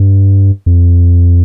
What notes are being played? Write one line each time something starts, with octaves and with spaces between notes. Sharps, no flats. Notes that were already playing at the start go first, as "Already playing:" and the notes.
Already playing: G2
F2